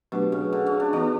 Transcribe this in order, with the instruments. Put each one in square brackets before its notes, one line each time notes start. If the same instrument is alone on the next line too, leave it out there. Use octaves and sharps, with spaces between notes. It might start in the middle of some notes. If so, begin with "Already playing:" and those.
[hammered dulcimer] B2 [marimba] F#3 A3 D4 G4 B4
[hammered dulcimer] C#3
D3
C#4
D4
[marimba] E3 B3 F#4 B4 [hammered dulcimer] D4